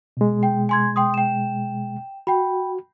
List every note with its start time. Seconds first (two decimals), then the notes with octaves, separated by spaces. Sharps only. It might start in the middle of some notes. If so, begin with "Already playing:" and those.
0.17 B2 G#3
0.43 G5
0.69 G#5 C6 G#6
0.96 G5 C6 D#6
1.14 G5 E7
2.27 F#4 G5 B5